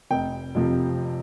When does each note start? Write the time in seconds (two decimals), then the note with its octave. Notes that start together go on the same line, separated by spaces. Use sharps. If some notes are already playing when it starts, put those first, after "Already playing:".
0.11 F1 G5
0.55 F2 C3 F3